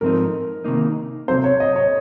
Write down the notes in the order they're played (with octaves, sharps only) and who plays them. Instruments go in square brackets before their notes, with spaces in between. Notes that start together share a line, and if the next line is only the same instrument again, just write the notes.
[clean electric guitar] G#2 F3 C4 D#4 [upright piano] A#4
[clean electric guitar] C3 D#3 A#3 D#4
[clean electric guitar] C3 F#3 C4 [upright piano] C5
[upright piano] C#5
D#5
C#5